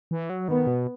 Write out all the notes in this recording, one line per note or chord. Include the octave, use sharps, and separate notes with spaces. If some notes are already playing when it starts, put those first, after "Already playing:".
E3
F#3
D#3 B3
B2